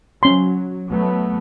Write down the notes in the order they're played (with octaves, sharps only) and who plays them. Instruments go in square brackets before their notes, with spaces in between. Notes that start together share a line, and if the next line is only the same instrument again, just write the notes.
[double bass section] F#3 [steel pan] C#4 C6
[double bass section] F#3 A3 B3